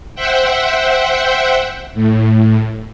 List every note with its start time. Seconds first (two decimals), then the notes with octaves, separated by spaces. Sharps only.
0.15 C5 E5 F#5 G5
1.95 A2